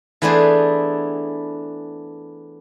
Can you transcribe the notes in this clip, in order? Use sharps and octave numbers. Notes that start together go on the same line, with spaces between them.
E3 A3 B3 D4 G#4 C5